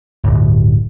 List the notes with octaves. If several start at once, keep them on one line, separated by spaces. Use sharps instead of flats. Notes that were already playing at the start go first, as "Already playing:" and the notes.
D1 G1